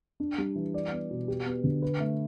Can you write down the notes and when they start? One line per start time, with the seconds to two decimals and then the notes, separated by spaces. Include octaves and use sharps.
0.20 D4
0.38 G3
0.55 E3
0.74 D5
0.91 B3
1.11 B2
1.28 G4
1.46 B3
1.64 D3
1.82 B4
2.00 A3